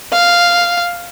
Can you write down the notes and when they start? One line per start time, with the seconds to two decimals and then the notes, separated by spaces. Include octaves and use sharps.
0.12 F5